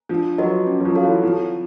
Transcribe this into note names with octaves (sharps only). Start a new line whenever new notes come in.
F3 D4
F#3 F#4 B4 D#5
C#4
F#3
F3
F#4 A4 C#5 F5
E3
F3 C4